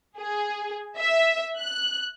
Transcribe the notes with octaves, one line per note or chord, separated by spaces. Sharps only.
G#4
E5
F#6